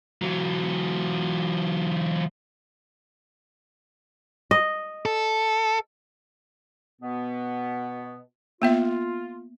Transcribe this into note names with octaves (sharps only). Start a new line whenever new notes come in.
E3 F#3
D#5
A4
B2 B3
A#3 B3 F4 E5